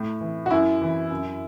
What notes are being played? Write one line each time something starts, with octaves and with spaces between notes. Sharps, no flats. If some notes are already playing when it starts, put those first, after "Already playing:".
Already playing: A2
E3
F#4
F#2 E4
E3
F#2